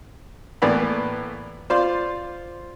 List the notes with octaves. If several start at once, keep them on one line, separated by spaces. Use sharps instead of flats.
A2 E3 A#3 B3 D5 B5
F4 C5 D5 C6